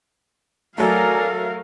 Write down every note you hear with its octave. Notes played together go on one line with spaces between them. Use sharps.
F#3 A3 A4 A#4 D5 F5 G#5 A#5